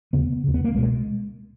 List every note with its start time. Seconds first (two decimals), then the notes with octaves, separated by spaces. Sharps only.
0.13 D#2 C#3 B3
0.44 D#2 C#3
0.54 B3
0.64 A#3
0.74 C#2 B2 G#3